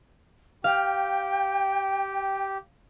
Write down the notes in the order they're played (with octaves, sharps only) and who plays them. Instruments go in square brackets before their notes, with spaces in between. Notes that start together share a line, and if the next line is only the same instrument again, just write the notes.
[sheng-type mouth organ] G4 [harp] F5 [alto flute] G5